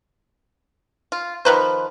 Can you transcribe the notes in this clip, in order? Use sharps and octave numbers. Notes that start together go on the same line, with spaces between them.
F4
D#3 F3 B4 C5